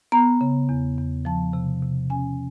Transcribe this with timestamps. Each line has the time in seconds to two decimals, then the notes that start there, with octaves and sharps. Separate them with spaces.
0.12 B3 A#5
0.41 C#3
0.69 E2
0.98 E2
1.25 F3 A5
1.53 C3
1.83 C3
2.10 C#4 G#5